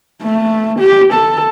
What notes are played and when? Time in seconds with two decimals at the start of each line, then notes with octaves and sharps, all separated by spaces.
0.23 A3
0.80 G4
1.14 A4